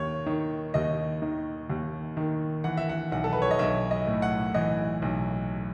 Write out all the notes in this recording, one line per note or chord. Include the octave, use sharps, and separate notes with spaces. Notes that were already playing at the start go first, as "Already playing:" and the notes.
Already playing: D#2 D#3 C#5
D#3
D#2 D#5
D#3
D#2
D#3
E3 F#5
E5
F#5
B1 F#5
A4
B4
C#5
D#5
B1 E5
D#5
A2
F#5
E3 D#5
B1